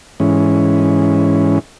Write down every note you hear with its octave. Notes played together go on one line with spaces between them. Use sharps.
G#2 E3 C#4